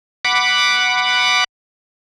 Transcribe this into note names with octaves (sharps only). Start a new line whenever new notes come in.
F#5 B5 D6